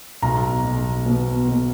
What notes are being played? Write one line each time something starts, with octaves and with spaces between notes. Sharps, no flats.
B1 A#5
B1
B2
B2